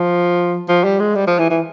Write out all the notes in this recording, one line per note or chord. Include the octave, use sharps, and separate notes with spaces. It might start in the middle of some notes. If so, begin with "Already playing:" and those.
Already playing: F3
F3
G3
G#3
G3
F3
E3
E3